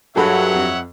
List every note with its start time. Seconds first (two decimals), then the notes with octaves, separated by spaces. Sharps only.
0.16 G2 F#3 G#4 A4 C#5 E5 F#5 B5
0.54 F2